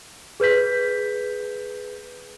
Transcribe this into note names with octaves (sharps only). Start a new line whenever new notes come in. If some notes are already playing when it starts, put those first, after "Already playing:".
G#4 B4 G6 B6